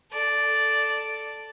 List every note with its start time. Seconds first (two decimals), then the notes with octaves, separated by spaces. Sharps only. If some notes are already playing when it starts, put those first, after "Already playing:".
0.12 A4 D5